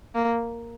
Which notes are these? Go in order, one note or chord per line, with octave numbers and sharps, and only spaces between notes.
A#3